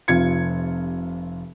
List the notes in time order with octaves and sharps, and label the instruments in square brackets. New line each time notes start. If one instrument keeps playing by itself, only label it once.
[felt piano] F1 C3 F4 G#6 C#7